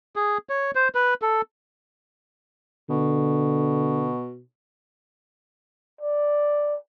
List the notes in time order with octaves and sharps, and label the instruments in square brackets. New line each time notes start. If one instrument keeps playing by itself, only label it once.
[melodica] G#4
C#5
C5
B4
A4
[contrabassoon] B2 [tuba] D3
[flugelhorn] D5